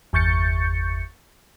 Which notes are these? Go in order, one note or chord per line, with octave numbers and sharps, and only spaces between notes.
G1 E2 C#6 G6 A6 C#7